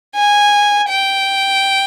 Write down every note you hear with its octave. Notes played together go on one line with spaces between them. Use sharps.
G#5
G5